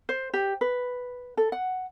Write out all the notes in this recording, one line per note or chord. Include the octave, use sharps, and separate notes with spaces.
C5
G4
B4
A4
F#5